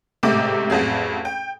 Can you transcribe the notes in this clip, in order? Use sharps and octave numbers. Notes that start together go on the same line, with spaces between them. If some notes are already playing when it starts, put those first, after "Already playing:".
A1 G#2 C3 A3 G4 D6
A1 F2 F#3 G#4
G5